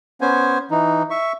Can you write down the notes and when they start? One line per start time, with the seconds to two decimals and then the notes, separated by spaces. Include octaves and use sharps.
0.21 B3 C#4 C5 G#5
0.71 E3 D#4
1.10 E5 C#6